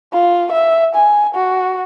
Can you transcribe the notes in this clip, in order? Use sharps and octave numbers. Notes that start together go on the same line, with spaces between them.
F4
E5
G#5
F#4